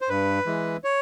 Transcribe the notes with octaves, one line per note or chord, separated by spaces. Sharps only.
C5
G2 B4
E3 G#3
C#5